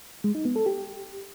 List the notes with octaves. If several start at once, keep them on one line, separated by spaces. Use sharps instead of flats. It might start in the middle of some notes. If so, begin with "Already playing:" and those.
G#3
D#4
B3
A4
G4